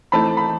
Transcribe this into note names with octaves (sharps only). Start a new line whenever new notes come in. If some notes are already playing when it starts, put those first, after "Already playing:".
E3 A3 C4 D#4 A5 B5
B5